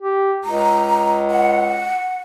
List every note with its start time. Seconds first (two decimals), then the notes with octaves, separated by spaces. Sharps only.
0.02 G4
0.44 C#2 A#5
1.30 F#5